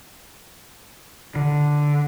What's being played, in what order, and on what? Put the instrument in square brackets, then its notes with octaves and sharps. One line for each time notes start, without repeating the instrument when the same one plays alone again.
[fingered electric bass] D3